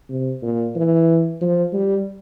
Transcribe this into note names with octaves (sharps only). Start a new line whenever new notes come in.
C3
A#2
E3
F3
G3